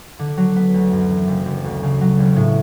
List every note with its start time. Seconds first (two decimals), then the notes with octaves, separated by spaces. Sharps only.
0.19 D3
0.37 F#3
0.56 B3
0.74 D2
0.92 F#2
1.10 E3
1.27 F#1
1.46 F#1
1.64 D2
1.83 C#3
2.01 F#3
2.19 E1
2.36 A2